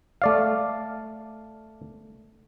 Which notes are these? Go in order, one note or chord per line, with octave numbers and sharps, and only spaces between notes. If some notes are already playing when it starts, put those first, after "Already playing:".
A3 D5 F5